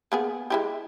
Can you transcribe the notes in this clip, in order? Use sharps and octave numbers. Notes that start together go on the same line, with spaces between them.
A#3 B3 G#4
G#3 E4 G4